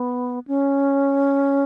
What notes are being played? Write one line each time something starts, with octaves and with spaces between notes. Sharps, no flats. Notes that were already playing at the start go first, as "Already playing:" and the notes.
Already playing: B3
C#4